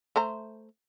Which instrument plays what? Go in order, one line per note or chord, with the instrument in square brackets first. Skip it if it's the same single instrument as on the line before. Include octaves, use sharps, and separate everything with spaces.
[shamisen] A3 C5 A#5